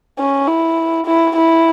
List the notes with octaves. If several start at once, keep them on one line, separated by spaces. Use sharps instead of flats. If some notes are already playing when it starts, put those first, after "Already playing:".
C#4
E4
E4
E4